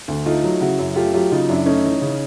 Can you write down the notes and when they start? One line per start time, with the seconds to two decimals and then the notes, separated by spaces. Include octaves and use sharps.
0.08 D2
0.26 A3 D#4 F4
0.44 F#3
0.61 C#3 E4 F#4
0.79 F#2
0.96 A3 F4 G4
1.14 F#3 F4 G4
1.31 C#3 D#4 F4
1.49 F#2 D4 E4
1.66 A3 C#4 D#4
1.84 E3
2.01 C#3